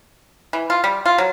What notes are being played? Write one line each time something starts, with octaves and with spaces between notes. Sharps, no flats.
E3
F4
G3
F4
F#3